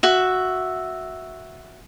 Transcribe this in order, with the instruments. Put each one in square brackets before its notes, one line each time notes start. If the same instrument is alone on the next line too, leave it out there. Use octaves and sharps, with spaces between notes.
[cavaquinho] F#4 E5